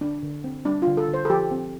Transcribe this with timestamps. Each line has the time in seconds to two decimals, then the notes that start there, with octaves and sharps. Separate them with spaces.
0.01 D3 D4
0.23 D3
0.44 C4
0.65 G3 D4
0.82 F4
0.87 D3
0.97 A4
1.08 D3
1.14 C5
1.25 A4
1.29 F3 G4
1.51 C4